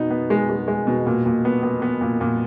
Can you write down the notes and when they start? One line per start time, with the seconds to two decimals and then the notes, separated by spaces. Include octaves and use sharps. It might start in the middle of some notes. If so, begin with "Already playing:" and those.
Already playing: B2 B3 D#4
0.10 B3
0.30 G#3
0.50 G#3
0.68 G#3
0.87 B2
1.06 A#2
1.26 A#2
1.45 B3
1.63 B3
1.82 B3
2.01 A#2
2.21 A#2